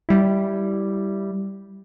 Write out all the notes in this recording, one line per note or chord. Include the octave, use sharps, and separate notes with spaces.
G3 E4